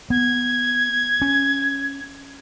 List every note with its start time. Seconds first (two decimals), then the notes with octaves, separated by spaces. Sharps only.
0.10 B3 G#6
1.22 C#4